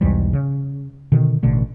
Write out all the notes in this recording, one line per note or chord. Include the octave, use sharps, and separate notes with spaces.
B1 E2 G#2 G3
C#3
B2 D3 D#3
A1 B2 D3 A3